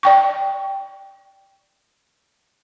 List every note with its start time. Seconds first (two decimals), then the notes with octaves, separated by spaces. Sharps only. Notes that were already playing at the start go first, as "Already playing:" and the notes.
0.03 D5 G5 C#6